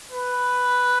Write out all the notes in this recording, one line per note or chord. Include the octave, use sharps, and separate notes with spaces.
B4